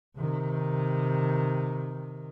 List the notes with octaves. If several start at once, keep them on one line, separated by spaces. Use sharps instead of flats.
C3 D#3